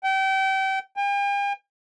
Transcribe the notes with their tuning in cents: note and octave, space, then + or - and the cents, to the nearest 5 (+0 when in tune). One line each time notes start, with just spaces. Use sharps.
G5 -30
G5 +45